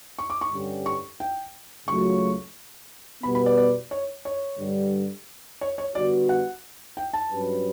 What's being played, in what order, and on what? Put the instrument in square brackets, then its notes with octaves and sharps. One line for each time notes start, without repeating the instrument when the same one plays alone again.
[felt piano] C#6
D6
C#6
[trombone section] G2 D3 G3 C#4 G4
[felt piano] C#6
G5
[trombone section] C#2 C#3 F#3 A3 [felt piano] C#6
[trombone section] B2 G3 B3 [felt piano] B5
[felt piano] B5
D5
D5
C#5
C#5
[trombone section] G2 D3 G3
[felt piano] C#5
C#5
[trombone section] D3 G3 B3 F#4 [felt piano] D5
[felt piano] F#5
G5
A5
[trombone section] G2 F#3 C#4 G4 B4